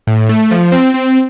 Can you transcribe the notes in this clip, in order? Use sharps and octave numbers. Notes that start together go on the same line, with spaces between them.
A2
A3
F3
C4
C4